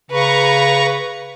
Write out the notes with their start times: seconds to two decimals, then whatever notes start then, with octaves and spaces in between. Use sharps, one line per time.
0.11 C#3 B4 A#5 C#6